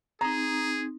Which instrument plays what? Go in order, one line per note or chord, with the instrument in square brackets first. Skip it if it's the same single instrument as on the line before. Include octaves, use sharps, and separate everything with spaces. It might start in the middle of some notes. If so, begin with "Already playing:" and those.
[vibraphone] C4 D#4 [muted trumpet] G#4 [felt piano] A#5